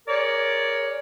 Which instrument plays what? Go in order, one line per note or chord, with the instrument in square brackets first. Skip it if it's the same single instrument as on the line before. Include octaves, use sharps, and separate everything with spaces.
[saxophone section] G#4 A#4 C#5 D5